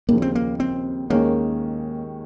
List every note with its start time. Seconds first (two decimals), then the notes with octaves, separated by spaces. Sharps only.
0.08 D#2 C#3 F3 A#3
0.22 C4
0.35 A#3
0.60 C4
1.10 D#2 D#3 G#3 A#3 C#4 G#4